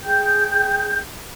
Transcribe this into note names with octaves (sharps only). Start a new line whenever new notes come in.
G#4 G5 G6